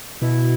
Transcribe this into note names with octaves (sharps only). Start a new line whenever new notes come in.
B2 E4